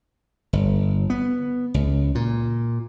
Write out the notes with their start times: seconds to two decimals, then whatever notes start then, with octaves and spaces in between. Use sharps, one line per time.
0.53 G1
1.10 B3
1.74 C#2
2.15 A#2